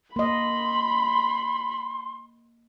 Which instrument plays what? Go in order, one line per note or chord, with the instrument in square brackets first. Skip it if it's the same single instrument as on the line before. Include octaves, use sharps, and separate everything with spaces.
[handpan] A#3 D#5 [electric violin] B5 [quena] C6